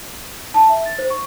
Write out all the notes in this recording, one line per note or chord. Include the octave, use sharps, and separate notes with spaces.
A5
E5
A6
C5
C#6